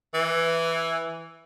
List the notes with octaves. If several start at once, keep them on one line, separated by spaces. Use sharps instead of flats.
E3